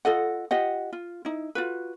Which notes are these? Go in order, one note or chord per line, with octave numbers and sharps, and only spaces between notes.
F4 A4 D#5 F#5
F4 G4 D#5 F#5
F4
D#4 E4
F4 F#4 B4